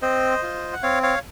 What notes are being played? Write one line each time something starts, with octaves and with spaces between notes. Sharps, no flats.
C4 C5 D#5
F4
F#5
C4 C#5 F5
C#5 F5